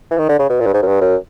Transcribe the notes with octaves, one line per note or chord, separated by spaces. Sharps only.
E3
D#3
D3
C#3
B2
A#2
G2
G#2
F#2
G2
F#2